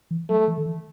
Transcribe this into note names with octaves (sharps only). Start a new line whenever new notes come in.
E3
F#3 A3
E3
D#3
E3